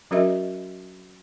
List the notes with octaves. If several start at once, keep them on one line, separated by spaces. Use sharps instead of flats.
F#3 C#4 F#4 A#4 D#5 E5